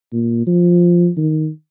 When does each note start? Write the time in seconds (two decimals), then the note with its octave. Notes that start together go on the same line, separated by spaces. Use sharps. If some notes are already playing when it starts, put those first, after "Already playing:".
0.12 A#2
0.47 F3
1.17 D#3